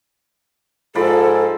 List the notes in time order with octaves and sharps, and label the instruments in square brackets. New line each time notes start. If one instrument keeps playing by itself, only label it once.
[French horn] G#2 [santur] F3 D5 B5 [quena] A4